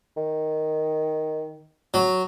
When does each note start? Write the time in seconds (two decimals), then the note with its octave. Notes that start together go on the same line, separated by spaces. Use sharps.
0.17 D#3
1.94 F#3